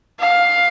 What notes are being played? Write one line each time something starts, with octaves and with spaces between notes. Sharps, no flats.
F5